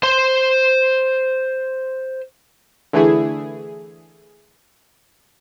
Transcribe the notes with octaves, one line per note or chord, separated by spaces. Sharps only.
C5 C6
D3 E3 A3 E4 G#4